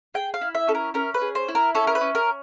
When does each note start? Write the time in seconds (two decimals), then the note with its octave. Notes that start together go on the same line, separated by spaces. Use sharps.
0.14 G#4 G5
0.34 F5
0.41 E4
0.55 E5
0.67 C#4 A4
0.75 A#4
0.94 C#4 A#4
1.14 B4
1.22 G#4
1.35 C5
1.48 E4
1.55 A#4
1.75 C#4 A4
1.87 A#4
1.95 B4
2.01 C#4
2.15 A#4